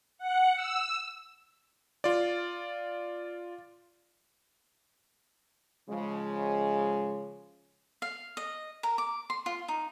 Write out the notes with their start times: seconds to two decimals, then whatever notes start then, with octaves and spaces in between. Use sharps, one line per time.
0.18 F#5
0.56 E6
2.04 F4 D5
5.89 C#3 F3 G#3
8.02 F5
8.37 D#5
8.83 A#4
8.98 D6
9.30 C6
9.46 F4
9.68 D#4